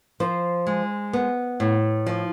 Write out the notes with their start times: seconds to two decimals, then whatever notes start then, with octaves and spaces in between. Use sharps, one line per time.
0.20 F3 C5
0.67 G#3
1.13 B3
1.60 A2
2.06 F3